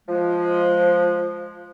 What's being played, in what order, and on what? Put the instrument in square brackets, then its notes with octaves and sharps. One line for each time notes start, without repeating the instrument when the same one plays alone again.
[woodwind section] F3 G#3